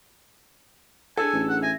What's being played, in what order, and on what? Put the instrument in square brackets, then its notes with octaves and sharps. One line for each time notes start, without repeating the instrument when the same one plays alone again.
[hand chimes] D4 G#4 E6 [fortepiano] A4 [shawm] G#5
[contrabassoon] A1
[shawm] F#5
[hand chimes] E5 A#6 [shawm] G#5